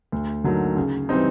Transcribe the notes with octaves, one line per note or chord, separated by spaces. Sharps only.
D2
D3 F#3 A#3 D#4
C#3
E3 G3 C4 D#4